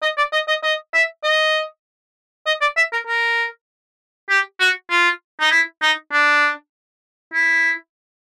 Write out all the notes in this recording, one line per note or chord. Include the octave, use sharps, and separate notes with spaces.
D#5
D5
D#5
D#5
D#5
E5
D#5
D#5
D5
E5
A#4
A#4
G4
F#4
F4
D#4
E4
D#4
D4
E4